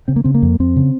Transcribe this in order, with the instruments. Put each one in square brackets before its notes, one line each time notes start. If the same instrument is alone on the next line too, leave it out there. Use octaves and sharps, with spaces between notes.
[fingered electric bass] C#3 C4
A#3
C#3 C4
A#3
F2
F2 C4
C#3